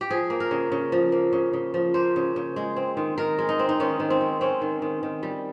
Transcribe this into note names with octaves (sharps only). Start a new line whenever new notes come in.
G4
F3 G#4
A#3
A#4
C#3
C#3
F3
A#3
C#3
C#3
F3
A#3 C5
C#3
C#3
G#3
C4
D#3
D#3 A#4
G#3
D#4
C4
D#4
D#3 C#4
D#3
C4
G#3
C4 C#4
D#3
D#3
D#3
G3